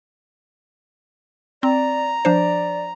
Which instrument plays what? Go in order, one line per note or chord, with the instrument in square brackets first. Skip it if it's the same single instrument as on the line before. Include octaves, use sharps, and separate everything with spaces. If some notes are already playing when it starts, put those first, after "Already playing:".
[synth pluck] C4 [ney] D5 [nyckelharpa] A#5
[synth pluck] F3 D4 C5 [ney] D5